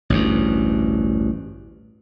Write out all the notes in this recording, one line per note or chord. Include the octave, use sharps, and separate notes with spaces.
A1 D2 G2